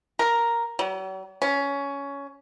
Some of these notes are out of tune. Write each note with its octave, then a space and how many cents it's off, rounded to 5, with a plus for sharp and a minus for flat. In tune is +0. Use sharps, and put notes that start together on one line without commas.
A#4 +0
F#3 +45
C#4 +15